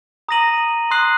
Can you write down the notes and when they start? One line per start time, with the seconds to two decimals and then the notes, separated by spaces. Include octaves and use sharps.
0.28 A#5 D#6 A#6 D#7 F#7
0.91 C6 D#6 F#6 C7 F#7